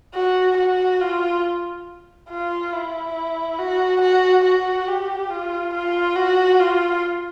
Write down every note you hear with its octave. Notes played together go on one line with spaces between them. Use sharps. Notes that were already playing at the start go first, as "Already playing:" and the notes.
F#4
F#4
F4
F4
E4
F#4
F#4
F#4
G4
F4
F4
F#4
F4